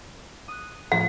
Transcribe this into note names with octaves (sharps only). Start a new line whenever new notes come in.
D#6 F#6
A2 F3 F5